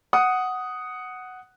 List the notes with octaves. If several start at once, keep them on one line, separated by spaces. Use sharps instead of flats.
F#5 D#6